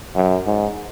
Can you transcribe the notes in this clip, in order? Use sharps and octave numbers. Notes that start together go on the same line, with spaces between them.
F#2
G#2